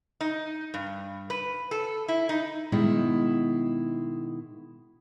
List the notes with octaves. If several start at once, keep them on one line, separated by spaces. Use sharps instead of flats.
D#4
G2
B4
A4
E4
D#4
B2 D#3 G#3 E4